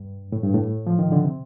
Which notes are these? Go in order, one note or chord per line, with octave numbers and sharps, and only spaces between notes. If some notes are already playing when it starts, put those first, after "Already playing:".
Already playing: G2
A2
G2
A2
F3
D#3
D3
C3